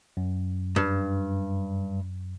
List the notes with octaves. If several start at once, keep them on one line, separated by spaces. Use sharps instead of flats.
F#2
G2